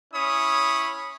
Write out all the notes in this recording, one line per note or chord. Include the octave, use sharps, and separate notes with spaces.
C#4 E4 C#5 B5 D#6